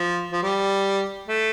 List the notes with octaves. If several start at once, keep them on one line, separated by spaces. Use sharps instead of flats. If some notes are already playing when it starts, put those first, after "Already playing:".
Already playing: F3
F3
G3
A3